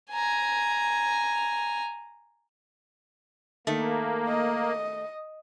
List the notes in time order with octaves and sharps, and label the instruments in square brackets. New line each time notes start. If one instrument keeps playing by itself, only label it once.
[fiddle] G#5 A#5
[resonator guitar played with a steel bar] D#3 A3 [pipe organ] A#3
[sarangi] D#5